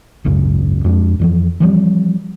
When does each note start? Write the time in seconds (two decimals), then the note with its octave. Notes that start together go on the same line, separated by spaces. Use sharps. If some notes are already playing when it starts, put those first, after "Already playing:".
0.24 G#1 C#2 F#2 C#3
0.84 F2 G#3 D4
1.19 F2 E3 F3
1.60 E3 F3 G3 C4